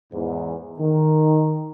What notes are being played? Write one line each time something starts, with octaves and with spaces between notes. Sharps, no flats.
E2 G#2
D#3